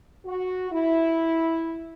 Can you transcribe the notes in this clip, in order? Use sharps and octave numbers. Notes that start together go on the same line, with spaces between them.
F#4
E4